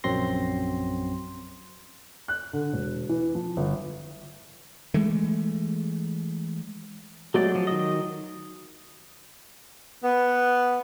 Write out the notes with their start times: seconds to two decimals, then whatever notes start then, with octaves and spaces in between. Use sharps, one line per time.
0.04 A#1 F#2 F#3 C4 C6 A#6
2.28 F#6
2.53 D3
2.73 E1
3.09 E3
3.35 F3
3.57 G1
4.94 E3 G#3 A3
7.34 F#3 G#3 A3 D5
7.55 F3
7.67 D#3 D#5
10.03 B3